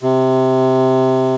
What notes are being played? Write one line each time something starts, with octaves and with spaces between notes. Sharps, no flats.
C3